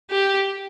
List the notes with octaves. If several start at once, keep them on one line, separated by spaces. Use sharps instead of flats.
G4